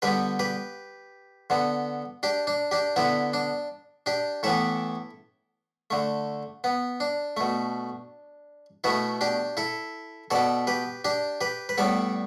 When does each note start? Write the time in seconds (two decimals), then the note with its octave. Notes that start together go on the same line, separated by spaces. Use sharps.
0.02 D3 G3 B3 G4 B4
0.39 G4 B4
1.50 D3 B3
2.23 D4 G4
2.47 D4
2.71 D4 G4
2.96 D3 B3 E4
3.33 D4
4.06 D4 G4
4.43 A2 E3 B3 E4 A4
5.90 D3 A3
6.64 B3
7.00 D4
7.37 B2 A3
8.84 B2 A3 B3 E4
9.21 D4 G4
9.57 E4 A4
10.31 B2 B3 A4 D5
10.67 G4 B4
11.05 D4 G4
11.41 G4 B4
11.69 B4
11.78 A2 G3 B3 A4 D5